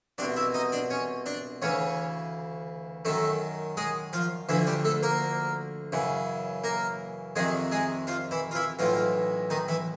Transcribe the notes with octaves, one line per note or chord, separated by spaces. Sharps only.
C2 B2 D4 D5
E4 E5
D#4 D#5
D4 D5
C#4 C#5
D4 D5
D2 C#3 E3 C#4 C#5
F#2 D#3 A3 A4
G#3 G#4
F3 F4
D2 D3 E3 F3 E4
G3 G4
A3 A4
A#3 A#4
F#2 C#3 E3
A#3 A#4
F2 C3 D#3 G#3 G#4
G#3 G#4
F3 F4
E3 E4
F4
E3 E4
B1 A2 E3 F3 F4
D#3 D#4
E3 E4